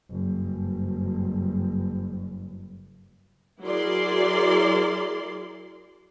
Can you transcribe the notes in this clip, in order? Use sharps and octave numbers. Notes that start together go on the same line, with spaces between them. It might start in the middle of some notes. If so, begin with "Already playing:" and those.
F#1 G2
F#3 E4 G#4 A#4 D5 C6